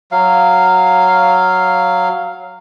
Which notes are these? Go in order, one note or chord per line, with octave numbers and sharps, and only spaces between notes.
F#3 F5